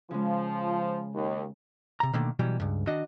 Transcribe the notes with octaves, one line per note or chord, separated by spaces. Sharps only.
C#3 F3 G#3
D#2
C3 A#5
B2 D3 D#3 A3 A#3
B2 E3 F#3 G3
C#2 G2
D#3 D4 F#4 D#5